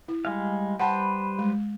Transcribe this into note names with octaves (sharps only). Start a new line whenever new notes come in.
E4
G3 G#3 F5
G3 B4 C5 F#5 G5 A5
G#3